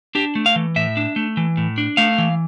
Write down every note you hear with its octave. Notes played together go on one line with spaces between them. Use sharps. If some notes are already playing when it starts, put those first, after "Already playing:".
D4 G4
A3
F5
E3
A2 E5
D4
A3
E3
A2
D4
A3 F5
E3